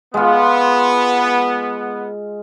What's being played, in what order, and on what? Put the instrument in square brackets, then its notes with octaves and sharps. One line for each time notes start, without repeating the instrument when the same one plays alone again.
[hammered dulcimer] G#3 F4 [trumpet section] B3